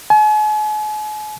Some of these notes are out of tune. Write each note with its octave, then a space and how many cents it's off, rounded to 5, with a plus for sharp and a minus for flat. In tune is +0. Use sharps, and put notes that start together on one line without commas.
G#5 +45